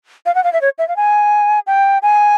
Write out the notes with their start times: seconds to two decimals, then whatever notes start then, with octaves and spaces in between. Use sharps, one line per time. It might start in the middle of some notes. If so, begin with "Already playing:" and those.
0.26 F5
0.35 F#5
0.44 F5
0.53 E5
0.61 C#5
0.79 E5
0.88 F5
0.96 G#5
1.67 G5
2.02 G#5